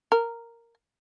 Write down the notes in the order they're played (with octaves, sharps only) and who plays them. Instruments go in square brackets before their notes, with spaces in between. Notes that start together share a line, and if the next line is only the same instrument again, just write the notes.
[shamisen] A#4